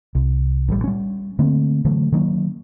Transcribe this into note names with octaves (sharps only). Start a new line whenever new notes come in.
C2
A1 G3
G3 C#4
D3 A3 A#3 C4
D3 E3 F#3 A3
D#3 F#3 A#3 C#4